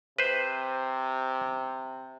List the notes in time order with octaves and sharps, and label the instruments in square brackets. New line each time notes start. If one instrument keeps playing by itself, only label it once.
[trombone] C3 [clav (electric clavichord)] B4 C5